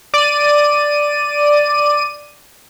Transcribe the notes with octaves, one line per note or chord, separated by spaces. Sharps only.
D5 D#7